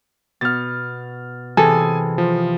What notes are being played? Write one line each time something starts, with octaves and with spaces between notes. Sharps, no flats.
B2 F6 A6
C3 E3 G#4 A4 G#5
F3